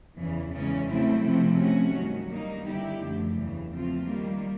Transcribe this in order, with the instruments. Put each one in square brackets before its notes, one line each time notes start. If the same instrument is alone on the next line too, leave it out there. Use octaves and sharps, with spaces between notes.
[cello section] E2 C#3 E3
E2 C#3 E3 G#3 C#4
C#3 F#3 A3 C4 E4
C3 F3 A3 C4
F3 A3 C#4 F#4
G2 D#3 F#3
D#3 G3 A#3 D#4
D3 G3 B3 E4 G4
F#2 D3 F3 A3
E2 C#3 E3
F3 A3 C4 F4
D#3 G3 A#3